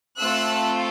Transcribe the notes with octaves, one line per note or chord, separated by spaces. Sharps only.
A3 C4 F4 A4 E6 F#6